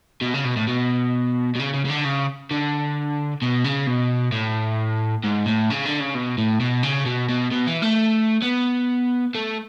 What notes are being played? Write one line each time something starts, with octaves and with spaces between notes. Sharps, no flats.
B2
C#3
B2
A2
B2
B2
C#3
C#3
C#3
D3
C#3
D3
B2
C#3
B2
A2
G#2
A2
C#3
D3
C#3
B2
A2
B2
C#3
B2
B2
B2
E3
A3
B3
A3